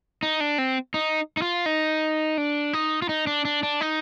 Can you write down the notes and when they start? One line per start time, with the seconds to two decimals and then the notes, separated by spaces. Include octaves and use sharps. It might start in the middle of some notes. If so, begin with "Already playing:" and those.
0.23 D#4
0.40 D4
0.58 C4
0.94 D#4
1.37 D#4
1.42 F4
1.66 D#4
2.38 D4
2.73 D#4
3.02 F4
3.09 D#4
3.27 D4
3.45 D4
3.63 D4
3.81 D#4